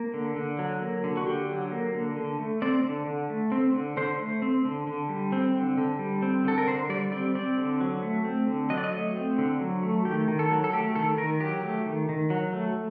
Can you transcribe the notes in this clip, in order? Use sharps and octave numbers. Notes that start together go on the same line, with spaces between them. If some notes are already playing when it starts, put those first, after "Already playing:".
Already playing: A#3
D3
D3
F#3
A#3
D3
F#4
D3 G4
F#3
A#3
D3
D3
A3
C4 D5
D3
D3
A3
C4
D3
D3 C5
A3
C4
D3
D3
G3
C4
D3
D3
G3
C4
D3 A4
A#4
D3 C5
G3 D5
C4 D5
C4 D5
D3
F#3
A3
C4
D3
F#3 D#5
D5
D#5
A3
C4
D3
F#3
A3
D#3 G4
D#3
A4
F#3
A4
A3 G4
D#3 A4
D#3 A#4
F#3 G4
A3
D#3
D#3
F#3
A3